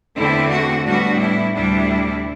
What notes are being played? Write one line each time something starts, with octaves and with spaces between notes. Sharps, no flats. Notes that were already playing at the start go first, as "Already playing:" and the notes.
E2 D3 A3 C4 E4
F#4
A2 G3 B3 D4 F#4
E4
D2 C3 G3 D4 E4